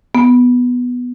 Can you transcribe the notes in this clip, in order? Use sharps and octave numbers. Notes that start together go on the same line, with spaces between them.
B3